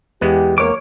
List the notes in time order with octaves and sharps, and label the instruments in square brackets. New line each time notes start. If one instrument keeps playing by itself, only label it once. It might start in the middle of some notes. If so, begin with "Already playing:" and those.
[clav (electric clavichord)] E2 G#3 B3 [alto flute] G4
[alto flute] A#3 [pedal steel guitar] C#5 D6